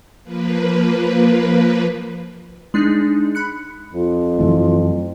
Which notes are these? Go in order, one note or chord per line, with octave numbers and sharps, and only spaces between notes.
F3 A#3 B4
G#3 D4 D#4 G#4
B5 F#6 C#7
F2 F4
F#2 E3 A3